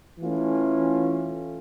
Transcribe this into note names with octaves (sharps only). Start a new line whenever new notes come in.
E3 A3 C#4 F4